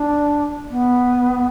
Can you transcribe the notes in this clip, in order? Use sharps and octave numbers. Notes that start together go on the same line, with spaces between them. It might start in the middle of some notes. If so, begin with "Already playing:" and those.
Already playing: D4
B3